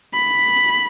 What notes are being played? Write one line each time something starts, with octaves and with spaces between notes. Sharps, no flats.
B5